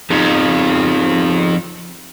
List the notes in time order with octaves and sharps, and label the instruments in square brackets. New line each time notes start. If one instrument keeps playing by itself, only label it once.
[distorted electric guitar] F2 [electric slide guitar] D#4 F4 G#4